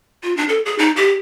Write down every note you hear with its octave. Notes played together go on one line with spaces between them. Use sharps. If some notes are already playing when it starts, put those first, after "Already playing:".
F4
D4
A4
G#4
D#4
G4